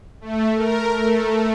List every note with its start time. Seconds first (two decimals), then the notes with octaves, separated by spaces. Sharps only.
0.21 A3
0.56 A#4
0.97 A3